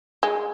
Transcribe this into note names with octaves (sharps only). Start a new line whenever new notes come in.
G#3